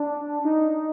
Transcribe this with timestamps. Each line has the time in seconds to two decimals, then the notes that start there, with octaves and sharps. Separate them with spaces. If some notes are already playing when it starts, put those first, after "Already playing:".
Already playing: D4
0.45 D#4